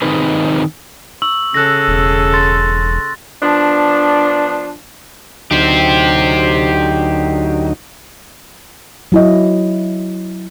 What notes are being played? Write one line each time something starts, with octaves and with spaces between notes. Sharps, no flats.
D#3 C4 D#4 F4 G#4 B4
C#6 E6 F#7
C#3 G#4 A4 F#6 A#6
E1
C6 A6
F3 B3 D4
D2 F#3 D#4 G4 C5
F#3 E4 D#5